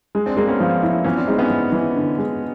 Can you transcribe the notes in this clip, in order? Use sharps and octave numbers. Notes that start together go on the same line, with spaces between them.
G#3
C4 D4
G#3 A#3 C4
B3 C#4
F3
E4
E3 B3 C#4
C4 D4
G#3 C#4 D#4
B3 C#4
E3
E3
D3
G#3